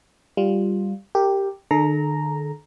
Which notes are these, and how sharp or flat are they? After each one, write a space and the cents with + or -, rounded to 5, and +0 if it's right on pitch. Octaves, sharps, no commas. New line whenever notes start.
G3 +0 F4 +0
G4 +0 A#4 -20
D3 +45 A4 -40 A#5 +0